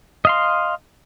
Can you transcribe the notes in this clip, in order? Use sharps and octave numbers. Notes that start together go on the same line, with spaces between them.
D#5 F5 C6